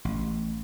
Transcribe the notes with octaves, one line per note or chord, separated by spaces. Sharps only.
A1